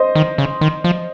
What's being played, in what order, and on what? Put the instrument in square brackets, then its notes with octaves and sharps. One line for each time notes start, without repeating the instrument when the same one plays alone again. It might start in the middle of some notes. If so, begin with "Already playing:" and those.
Already playing: [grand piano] C5 D#5
[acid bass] D#3
C#3
D#3
F3